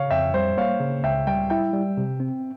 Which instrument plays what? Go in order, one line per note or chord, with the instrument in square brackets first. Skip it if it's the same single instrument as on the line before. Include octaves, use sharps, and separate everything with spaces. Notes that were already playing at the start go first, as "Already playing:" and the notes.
Already playing: [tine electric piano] C#3 [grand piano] C#5 F5
[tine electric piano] F2 [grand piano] E5 G5
[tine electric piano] G3 [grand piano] C5 E5
[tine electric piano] A#3 [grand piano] C#5 F5
[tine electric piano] C#3
[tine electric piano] C#2 [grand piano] E5 G5
[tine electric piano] G3 [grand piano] E5 G5
[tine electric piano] E4 [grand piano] E5 G5
[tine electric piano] G3
C3
C4